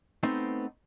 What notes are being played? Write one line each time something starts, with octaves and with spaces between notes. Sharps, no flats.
A3 B3 C4 D#4